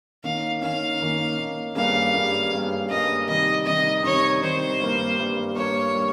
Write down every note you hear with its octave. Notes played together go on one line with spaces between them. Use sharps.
D#3 A#3 C#4 F5
D#3 A#3 C#4 F5
D#3 A#3 C#4
D#3 A#3 C#4
G2 G3 A#3 C#4 G#4 F5
G2 G3 A#3 C#4 G#4
G2 G3 A#3 C#4 G#4
G2 G3 A#3 C#4 G#4 D#5
C3 D#3 G3 D#5
C3 D#3 G3 D#5
C3 D#3 G3 C#5
C3 D#3 G3 C5
G2 G3 A#3
G2 G3 A#3
G2 G3 A#3 C#5
G3 A#3